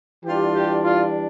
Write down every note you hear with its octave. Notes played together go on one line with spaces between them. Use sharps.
E3 G3 D4 F4 G4
G4
F4